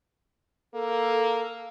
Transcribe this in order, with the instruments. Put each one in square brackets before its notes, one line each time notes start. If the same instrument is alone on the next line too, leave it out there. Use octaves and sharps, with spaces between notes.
[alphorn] A#3 [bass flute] A4